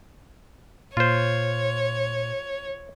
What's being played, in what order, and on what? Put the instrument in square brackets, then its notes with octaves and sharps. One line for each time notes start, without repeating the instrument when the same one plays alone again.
[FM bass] A#2 [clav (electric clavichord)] F4 C5 [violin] C#5